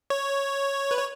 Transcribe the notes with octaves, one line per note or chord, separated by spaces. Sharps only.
C#5
B4
C#5